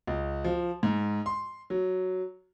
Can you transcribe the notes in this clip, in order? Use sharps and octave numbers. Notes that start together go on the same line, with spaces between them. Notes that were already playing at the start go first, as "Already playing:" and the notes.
C#2
F3
G#2
C6
F#3